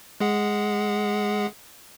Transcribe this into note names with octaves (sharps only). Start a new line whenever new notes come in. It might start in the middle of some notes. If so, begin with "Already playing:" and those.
G#3 G#4 F#5